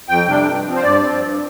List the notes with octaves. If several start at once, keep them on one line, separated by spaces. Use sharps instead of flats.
F2 G5
C3 G3 D4
G2
F3 C4
C5
G2 D5
F3 C4
G2